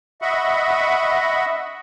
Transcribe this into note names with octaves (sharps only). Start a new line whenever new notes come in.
D#5 E5 F#5 B5 C#6